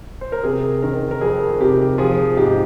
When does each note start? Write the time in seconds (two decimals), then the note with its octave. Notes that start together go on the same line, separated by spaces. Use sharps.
0.21 C5
0.32 A#4
0.44 C3 G#4
0.82 D#3 A#4
1.11 A#4
1.21 F2 G#4
1.61 C3 G4
1.98 F3 G#4
2.37 G#2 G4